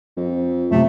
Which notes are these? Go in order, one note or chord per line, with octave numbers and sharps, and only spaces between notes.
F2
F#2 C3 A3